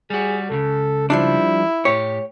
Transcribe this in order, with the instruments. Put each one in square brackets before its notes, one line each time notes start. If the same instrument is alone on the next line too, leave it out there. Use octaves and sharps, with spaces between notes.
[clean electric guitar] G3 F#4 [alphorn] G#4
[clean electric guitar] C#2 A2 C#3 [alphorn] A4
[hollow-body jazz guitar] F3 G3 D4 [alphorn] E4
[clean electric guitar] A2 G4 [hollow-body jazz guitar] C#5